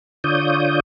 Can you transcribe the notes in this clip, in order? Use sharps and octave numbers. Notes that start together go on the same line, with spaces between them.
D3 F4 C#5 D5 D#6 G6